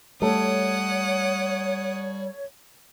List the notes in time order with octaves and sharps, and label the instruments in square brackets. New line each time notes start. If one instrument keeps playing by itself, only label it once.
[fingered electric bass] G3 [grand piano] A3 A4 [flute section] C#5 [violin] F#5 D#6